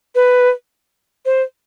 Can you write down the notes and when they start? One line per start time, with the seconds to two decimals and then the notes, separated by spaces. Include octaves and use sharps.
0.15 B4
1.26 C5